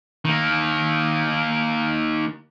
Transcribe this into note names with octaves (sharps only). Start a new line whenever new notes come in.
D#3 A#3